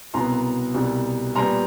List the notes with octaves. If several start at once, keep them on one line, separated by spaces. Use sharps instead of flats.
C2 B2 F#3 B3 A#5 C6
C2 B2 G3 B3
A#2 G3 B3 A#5 C6